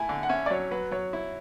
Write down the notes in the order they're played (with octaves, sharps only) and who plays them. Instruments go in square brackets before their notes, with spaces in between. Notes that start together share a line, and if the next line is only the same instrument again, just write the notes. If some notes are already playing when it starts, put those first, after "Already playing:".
Already playing: [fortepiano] A3 E4 [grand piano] G#5
[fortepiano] D3
[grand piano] F#5
[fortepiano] C#4 [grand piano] E5
[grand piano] D5
[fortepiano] F#3 [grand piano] C#5
[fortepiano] F#3 [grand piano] B4
[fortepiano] F#3 [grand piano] C#5
[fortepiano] E4